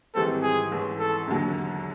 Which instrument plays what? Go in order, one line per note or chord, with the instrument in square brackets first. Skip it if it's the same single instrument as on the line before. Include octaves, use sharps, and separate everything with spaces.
[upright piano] G#1 G#2 E3 G3 C4 [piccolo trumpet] A4
[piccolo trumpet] G#4
[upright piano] A1 G#2 E3
[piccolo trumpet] A4
[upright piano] E1 D#2 D3 F#3